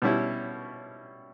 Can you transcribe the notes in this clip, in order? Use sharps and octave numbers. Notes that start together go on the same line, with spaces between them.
B2 G3 C#4 E4